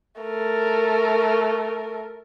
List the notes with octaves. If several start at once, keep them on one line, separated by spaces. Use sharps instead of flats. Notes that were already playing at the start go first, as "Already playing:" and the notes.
A3 A#4